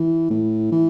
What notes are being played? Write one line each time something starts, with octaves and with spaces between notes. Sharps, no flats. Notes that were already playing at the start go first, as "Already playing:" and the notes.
Already playing: E3
A2
E3